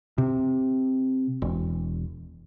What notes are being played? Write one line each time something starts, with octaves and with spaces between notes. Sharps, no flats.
C3
E1